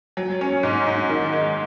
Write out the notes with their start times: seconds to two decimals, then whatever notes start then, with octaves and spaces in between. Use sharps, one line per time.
0.17 F#3
0.41 C#4
0.63 G#2
0.87 G#2
1.09 D#3
1.33 G#3